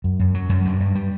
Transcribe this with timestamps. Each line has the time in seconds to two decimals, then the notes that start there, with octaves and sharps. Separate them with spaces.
0.04 F#2
0.19 F#2
0.34 F#3
0.49 F#2
0.65 G2
0.80 G2
0.95 G3